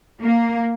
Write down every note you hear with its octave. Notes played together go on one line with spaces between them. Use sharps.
A#3